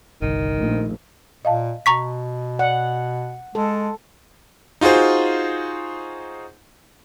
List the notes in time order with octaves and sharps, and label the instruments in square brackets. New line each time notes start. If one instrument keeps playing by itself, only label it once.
[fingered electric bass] G1 C2 [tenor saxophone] D#3
[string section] A#1 [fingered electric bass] A3
[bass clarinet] A#2 [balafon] D#5 F5 A5
[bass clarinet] B2 [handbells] A#5 C#6 B6
[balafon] D5 [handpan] F#5
[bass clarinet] G#3 [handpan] A4
[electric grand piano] D#4 F4 F#4 G#4 C5